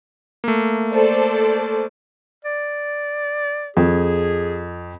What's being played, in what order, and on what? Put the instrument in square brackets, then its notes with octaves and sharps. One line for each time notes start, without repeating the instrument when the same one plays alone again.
[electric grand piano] A3 A#3
[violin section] A4 C5 D5
[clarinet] D5
[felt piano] F2 [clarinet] G#4